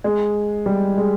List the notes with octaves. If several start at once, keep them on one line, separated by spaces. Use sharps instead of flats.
G#3
G3
G#3